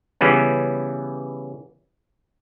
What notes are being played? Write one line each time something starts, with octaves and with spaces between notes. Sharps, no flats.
C#3 E3 G3 B3 C#4